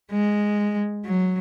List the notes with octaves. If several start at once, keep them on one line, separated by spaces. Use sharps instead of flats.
G#3
F#3